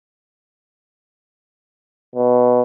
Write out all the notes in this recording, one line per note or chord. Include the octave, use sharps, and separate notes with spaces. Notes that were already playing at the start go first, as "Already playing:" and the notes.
B2